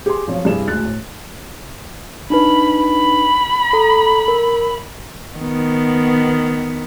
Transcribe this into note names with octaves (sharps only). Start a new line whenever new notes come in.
G4 G#4 C6
B1 F3 C4 C#5
G2 C3 E4 G#4 D5 E7
D2 G#3 F#6 A6
A2
D4 D#4 B4 B5
B5
A4 A#5
A#4
D#3 B3